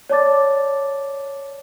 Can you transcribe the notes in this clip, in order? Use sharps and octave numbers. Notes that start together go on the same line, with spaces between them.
C#5 D5 A5 D6 A6